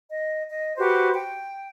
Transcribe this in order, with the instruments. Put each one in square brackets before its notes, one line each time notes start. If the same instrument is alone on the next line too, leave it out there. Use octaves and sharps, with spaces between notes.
[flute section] D#5
D#5
F#4 G4 B4 C5
G5